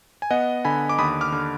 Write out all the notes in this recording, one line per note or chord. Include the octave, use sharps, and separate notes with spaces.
G#5
B3 D#5 F#5
D3 G#5 B5
D6
D#2 B5 D#6
D6 F6
D3